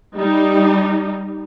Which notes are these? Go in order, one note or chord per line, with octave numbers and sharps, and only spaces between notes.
G3 D#4